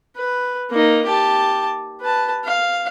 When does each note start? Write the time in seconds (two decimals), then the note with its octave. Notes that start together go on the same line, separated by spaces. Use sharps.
0.16 B4
0.70 A#3 D#4
1.05 G4 A5
2.01 B4 A5
2.44 F5